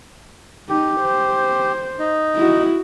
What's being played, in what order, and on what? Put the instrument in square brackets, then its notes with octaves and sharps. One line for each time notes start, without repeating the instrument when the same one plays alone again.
[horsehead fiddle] D#4 [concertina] G4
[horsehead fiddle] C5
[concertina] D#4
[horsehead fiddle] E4 F#4